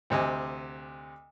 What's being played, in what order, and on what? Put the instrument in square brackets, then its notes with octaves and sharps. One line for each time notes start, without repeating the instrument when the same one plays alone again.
[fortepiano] D2 C3 D#5 G#5